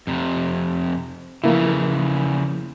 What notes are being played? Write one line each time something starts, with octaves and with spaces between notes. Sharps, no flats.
F2 C3
C#3 E3 F3 A#3 E4